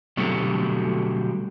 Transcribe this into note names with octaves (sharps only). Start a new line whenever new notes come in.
B2 D3 F#3 G3 A3 C4